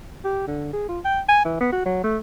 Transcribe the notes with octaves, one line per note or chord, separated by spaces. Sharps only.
G4
D3
G#4
F4
G5
G#5
E3
B3
F#4
F#3
A3